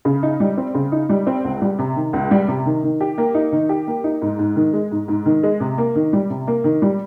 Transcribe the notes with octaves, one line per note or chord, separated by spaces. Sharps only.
C#3
D#4
G3
C4
C#3
D#4
G3
C4
C#2
G3
C3
D#3
C#2
G3
C3
D#3
D#3
G4
A#3
D#4
D#3
G4
A#3
D#4
G#2
G#2
D#3
G#3
G#2
G#2
D#3
G#3
C3
A#3
D#3
G3
C3
A#3
D#3
G3